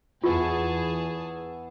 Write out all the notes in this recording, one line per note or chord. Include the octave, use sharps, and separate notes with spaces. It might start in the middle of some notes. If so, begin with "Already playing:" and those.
E2 B3 E4 F4 G#4 C#5 A5